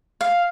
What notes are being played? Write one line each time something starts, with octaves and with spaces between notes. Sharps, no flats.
F5